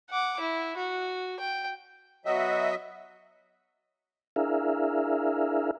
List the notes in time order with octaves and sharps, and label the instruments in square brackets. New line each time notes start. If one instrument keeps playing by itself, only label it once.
[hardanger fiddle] F#5 D6
E4
F#4
G5
[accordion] F#3 D#5 E5 [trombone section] B3 F#4
[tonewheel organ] D4 E4 G#4 A#4 E5 F5